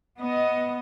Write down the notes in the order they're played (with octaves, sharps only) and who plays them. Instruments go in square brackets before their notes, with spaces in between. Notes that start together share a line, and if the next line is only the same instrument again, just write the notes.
[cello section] B3 D#5